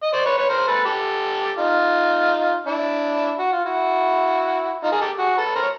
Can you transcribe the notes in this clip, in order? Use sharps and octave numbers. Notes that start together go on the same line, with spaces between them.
D#5
C5 D5
B4 C#5
B4 C#5
A#4 C5
A4 B4
G4 A4
D#4 F4
D4 E4
F#4
F4
E4 F#4
D#4 F4
G#4 A#4
G4 A4
F#4 G#4
A4 B4
A#4 C5
C#5